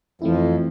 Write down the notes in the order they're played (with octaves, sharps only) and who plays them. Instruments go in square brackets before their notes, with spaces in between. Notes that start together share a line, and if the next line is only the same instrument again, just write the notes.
[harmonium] F2 F3 [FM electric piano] E3 A3 C4 E4